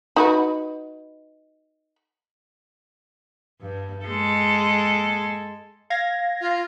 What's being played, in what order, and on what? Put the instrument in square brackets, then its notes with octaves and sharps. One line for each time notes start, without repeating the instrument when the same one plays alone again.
[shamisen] D#4 F#4 B4
[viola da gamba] G2
G#3 A4
[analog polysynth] F5 G#6 A#6
[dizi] F4